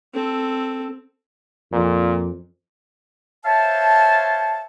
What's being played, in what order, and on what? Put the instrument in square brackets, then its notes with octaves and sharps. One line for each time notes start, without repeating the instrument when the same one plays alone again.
[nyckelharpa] C4 A4
[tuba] F2 [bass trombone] A#2
[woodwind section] C5 C#5 E5 F5 A5